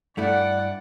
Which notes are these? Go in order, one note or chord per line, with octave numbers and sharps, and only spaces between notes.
G2 A3 E4 D5 F#5